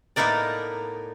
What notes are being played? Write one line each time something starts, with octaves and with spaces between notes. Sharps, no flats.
A2 A#3 B3 D#4 A#4 D5